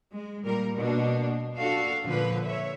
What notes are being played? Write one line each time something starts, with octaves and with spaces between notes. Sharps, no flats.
G#3
A#2 G3 A#4
B2 A#3 D4
D4 F#4 A4 F5
A#2 D3 F3 B4
C#5 E5